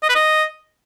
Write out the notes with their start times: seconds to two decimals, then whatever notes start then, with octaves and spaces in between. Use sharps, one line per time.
0.03 D#5
0.09 B4
0.15 D#5